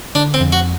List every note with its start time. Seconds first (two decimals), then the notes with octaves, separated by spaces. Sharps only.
0.15 D3 D4
0.34 C4
0.40 F2
0.52 F#4